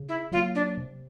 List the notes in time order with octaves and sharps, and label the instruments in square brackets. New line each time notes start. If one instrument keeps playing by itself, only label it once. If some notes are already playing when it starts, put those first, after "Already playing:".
Already playing: [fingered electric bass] C#3
[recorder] E4
[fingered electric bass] F#3 [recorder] F4
[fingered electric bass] A#3
[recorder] D4
[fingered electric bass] C3